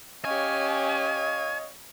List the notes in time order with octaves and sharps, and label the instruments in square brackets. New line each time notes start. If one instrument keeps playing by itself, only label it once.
[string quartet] C#4 G4 [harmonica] C#5 F5 [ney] D#5 [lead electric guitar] G#5